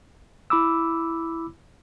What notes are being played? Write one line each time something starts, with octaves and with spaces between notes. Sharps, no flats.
E4 B5 D6 E6